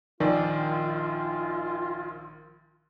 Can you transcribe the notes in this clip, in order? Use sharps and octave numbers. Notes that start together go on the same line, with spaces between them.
A#1 D#3 F4 D5